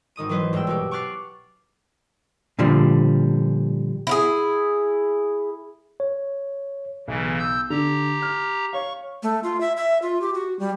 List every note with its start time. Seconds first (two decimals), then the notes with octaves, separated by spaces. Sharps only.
0.16 G#1 D#3 D#6 D#7
0.29 E3 F#3 F#4 B4 C5 D#5
0.53 A#1 G2 G#3 B3 G5 E6
0.67 B2 F#4 G4
0.91 C#6 D6 F6 F#6 A6 C7
2.59 A#2 D3 F3 G3
4.07 E4 F4 G#4
6.00 C#5
7.08 B1 C#3 E3
7.39 E6 G6
7.70 D3 G4 A#5
8.22 F6
8.73 C#5 F5 C#6
9.23 A3
9.43 F4
9.60 E5
9.77 E5
10.02 F4
10.21 G4
10.34 F#4
10.59 G3